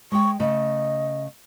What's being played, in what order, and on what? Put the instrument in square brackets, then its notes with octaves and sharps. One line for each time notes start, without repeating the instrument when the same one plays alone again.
[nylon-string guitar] G#3 G#4 G5 [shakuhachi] C#6
[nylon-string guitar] C#3 A3 [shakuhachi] D#5